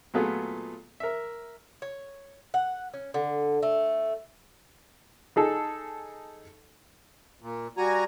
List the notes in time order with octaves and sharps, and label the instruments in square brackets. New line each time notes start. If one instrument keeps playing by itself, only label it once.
[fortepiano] A#2 F#3 A3 B3 F4 G#4
A#4 E5
[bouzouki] C#5
F#5
C#4
D3
A3
[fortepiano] D#4 G#4 A4
[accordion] A#2
G3 F#4 G#5 A#5